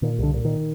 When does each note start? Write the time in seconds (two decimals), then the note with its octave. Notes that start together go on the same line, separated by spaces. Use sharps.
0.02 A#2 D#3
0.19 C2 D3
0.34 A#2
0.45 D#3